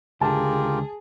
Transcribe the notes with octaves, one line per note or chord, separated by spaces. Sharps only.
C#2 D3 F4 G4 G#4 A#4 A5